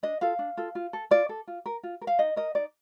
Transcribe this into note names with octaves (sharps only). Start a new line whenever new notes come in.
D4 D#5
F4 A4 F5
D4
F4 A4
F4
A4
F4 D5
A4
F4
A#4
F4
A#4
F5
D#4 D#5
A#4 D#5
D#4 D5